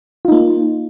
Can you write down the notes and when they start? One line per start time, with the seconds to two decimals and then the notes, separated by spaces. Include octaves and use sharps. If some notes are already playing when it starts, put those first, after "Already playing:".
0.25 F4
0.28 D#4
0.32 A#3